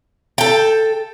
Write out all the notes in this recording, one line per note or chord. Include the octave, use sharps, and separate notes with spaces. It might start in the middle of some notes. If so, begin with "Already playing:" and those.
A4 G5